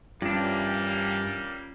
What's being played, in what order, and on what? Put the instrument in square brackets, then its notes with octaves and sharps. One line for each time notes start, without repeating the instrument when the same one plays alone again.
[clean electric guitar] G2 D4 [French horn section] E3 G4 [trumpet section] G3 A#3 [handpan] C#4 F4